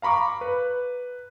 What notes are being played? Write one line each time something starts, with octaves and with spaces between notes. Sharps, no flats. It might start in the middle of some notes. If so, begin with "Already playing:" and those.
F5 A#5 B5 C#6 D6
B4